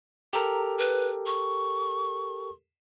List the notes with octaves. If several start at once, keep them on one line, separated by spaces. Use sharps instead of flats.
G4 A4 A#4 A#5
B4
C#6